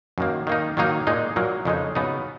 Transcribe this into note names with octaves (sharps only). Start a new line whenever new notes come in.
F#2 D#3 A#3
D#3 A#3 D#4
D#3 F#3 A#3 D#4
A#2 G#3 D#4
A#2 F#3 A#3
F2 C#3 G#3 D#4
C#3 F#3 B3 D#4